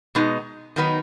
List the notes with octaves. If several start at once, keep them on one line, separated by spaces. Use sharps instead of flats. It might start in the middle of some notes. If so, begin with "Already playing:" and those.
B2 G#3 B3 D#4
D#3 F#3 B3 D#4